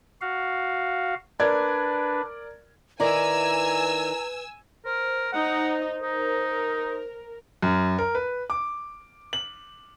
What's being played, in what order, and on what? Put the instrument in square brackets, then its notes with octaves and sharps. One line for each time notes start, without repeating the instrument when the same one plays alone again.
[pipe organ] F#4 F5
[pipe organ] D4 B4 [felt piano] A#4 D5 G#6
[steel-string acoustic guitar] D#3 E4 D5 [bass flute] B4 [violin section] G#5 E6 [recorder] A#5
[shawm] A#4 [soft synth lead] C5
[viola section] D#4 D#5 [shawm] F#5
[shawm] D#4 [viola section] A#4
[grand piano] F#2
A#4
B4
D6
F#7